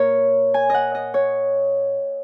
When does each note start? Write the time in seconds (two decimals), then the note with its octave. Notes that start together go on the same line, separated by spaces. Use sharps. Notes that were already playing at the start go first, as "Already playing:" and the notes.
Already playing: A#2 A#4 C#5
0.54 G#5
0.70 D#5 F#5
0.95 D#5
1.14 C#5